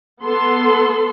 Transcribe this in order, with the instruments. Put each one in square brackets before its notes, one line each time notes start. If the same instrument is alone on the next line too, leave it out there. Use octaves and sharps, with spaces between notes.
[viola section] B3 A4 C6